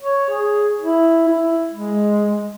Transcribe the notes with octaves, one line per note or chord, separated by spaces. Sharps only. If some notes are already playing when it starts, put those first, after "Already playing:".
C#5
G#4
E4
E4
G#3